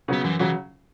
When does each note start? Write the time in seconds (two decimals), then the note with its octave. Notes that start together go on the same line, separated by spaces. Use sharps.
0.08 C#3 F#3 B3
0.24 F#2 E3
0.39 C#3 E3 F#3